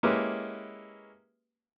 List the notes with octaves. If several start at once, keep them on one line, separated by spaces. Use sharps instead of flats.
G#3 A#3 C#4 E4 G4 B4